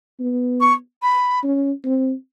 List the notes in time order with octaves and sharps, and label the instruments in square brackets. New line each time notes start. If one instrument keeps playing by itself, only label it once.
[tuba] B3
[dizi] C#6
B5
[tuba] C#4
C4